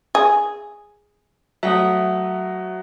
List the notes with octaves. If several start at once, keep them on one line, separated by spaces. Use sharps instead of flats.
G#4
F#3 A3 E5 F#5 D#6